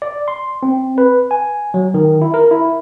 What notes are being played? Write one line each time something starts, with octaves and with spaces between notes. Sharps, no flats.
D5
C6
C4
B4
G#5
F#3
D#3
E4
A#4
E4